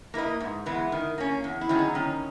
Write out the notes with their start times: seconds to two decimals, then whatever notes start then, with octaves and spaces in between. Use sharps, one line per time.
0.14 A#3 E4 B4 D#5
0.40 G#2
0.66 E3 G#3 B3
0.92 D#3
1.18 A#3 C#4
1.44 E2
1.61 E4
1.69 D#3 F#3 C#4 G#4
1.79 D#4
1.95 D#3 C#4